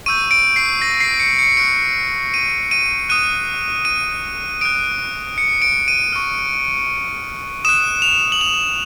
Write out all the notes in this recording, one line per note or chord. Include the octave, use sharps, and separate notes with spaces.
C#6 E6 G6 D#7
D7
C7
A#6
C7
C#7
C#7
C#6 F#6 D7
D#7
D#7
D#6 F#6 D#7
D#7
D#6 F#6 D7
C#7
D7
D#7
C#6 F6
D#6 F#6 E7
F7
F#7
F7